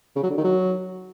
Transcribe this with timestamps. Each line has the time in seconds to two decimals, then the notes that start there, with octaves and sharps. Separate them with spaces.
0.16 C#3
0.23 F#3
0.30 D3
0.37 D#3
0.44 F#3